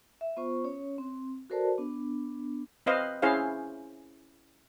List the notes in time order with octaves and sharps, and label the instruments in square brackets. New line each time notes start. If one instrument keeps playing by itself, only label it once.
[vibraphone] E5
B3 F4 C5 C#6
C#4 C#5
C4
F#4 A4 A#4 C5 D5 A5
B3 D4
[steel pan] C4 B4 C5 D#5 F5
C#4 E4 G#4 C5 F5